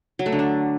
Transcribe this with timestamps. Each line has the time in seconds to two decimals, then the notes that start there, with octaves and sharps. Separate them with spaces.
0.19 F#3
0.26 A3
0.32 D3
0.39 D4